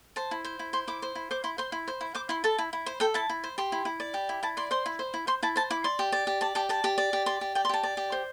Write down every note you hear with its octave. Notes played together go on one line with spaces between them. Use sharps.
C5 A5
E4
C5
E4
C5 C6
E4 D6
C5
E4
C5 D6
E4 C6
C5 C6
E4
C5
E4
C5 D6
E4 C6
A4 A5
E4
E4
C5
A4 G5
E4 A5
E4
C5
G4 C6
E4
E4
D5
G4
E4
E4 A5
D5 C6
C5 C6
E4
C5
E4
C5 C6
E4 A5
C5 A5
E4 D6
D5 C6
G4
D5
G4
D5 A5
G4 A5
D5 A5
G4
D5
G4
D5 C6
G4
D5 G5
C6
G4 A5
D5
G4
C5